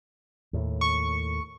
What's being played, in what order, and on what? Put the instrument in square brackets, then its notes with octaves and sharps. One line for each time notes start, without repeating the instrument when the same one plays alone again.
[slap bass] D#2 A2
[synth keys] C#6